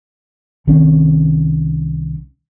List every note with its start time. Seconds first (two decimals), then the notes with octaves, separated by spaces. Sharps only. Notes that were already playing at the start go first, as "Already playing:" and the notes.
0.67 C2 D#3 C4 C#4